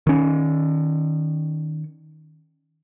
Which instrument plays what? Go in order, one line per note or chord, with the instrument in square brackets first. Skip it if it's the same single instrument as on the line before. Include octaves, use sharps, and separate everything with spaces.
[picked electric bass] D#3 C#4